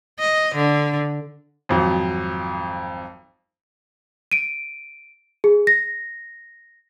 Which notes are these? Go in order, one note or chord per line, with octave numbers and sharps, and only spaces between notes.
D#5
D3
G#1 F2 F#3
D7 D#7
G#4
A#6